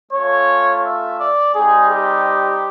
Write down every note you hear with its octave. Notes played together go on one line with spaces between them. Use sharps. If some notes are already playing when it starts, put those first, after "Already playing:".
A3 C#4 F4 C#5
E5
D5
G3 C4 D#4 G4 G#4
G4